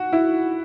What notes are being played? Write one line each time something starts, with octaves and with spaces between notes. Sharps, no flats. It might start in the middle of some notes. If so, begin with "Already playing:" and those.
Already playing: F#4
E4